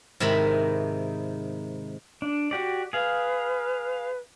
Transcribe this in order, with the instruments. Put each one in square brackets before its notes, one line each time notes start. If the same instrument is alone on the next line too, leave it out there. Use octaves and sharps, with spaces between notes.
[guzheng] G#2 C3 D#3 E4 A#4 B5
[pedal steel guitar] D4
F#4 G4 D5
[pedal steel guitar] G#4 F5 [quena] B4